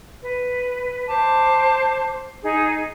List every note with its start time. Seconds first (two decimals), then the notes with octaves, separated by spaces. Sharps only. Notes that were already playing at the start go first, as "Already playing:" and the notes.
0.23 B4
1.08 C5 A5 D6
2.43 D#4 G#4